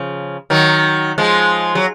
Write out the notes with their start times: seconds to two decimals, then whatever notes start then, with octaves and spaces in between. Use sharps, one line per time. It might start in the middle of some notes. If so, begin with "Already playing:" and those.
Already playing: C#3 F3
0.50 D#3 F#3
1.18 F3 G#3
1.75 F#3